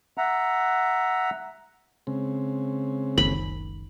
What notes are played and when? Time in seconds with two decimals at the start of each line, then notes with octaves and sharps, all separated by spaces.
0.18 E5 F#5 A#5
2.07 C#3 G#3 C4
3.18 F#1 C#2 D#3 B5